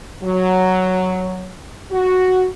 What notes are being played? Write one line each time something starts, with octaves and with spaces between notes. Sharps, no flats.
F#3
F#4